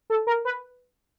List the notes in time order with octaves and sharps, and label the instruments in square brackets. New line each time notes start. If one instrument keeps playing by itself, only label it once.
[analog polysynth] A4
A#4
B4